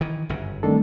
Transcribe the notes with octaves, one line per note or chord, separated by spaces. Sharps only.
D#3 E3
G1 F#2 C#3
D#3 G3 A3 C4 D4 A4